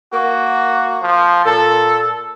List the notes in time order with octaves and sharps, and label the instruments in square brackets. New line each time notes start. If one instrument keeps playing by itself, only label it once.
[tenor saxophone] A#3 [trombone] F#4
[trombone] F3
[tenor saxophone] A#2 [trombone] A4